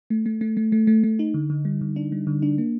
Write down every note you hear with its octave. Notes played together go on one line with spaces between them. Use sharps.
A3
A3
A3
A3
A3
A3
A3
D#4
D3
D3
G3
D3
D4
G3
D3
D4
A#3